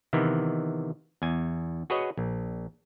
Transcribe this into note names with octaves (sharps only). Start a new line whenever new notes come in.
C3 D#3 E3 B3
E2 G#5
F#4 G#4 B4 C#5 D#5
A#1